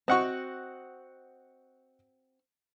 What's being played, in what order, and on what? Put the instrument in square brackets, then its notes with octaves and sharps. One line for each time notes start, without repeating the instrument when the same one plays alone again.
[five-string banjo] C4 F#4 [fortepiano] D#5 F#5 C#6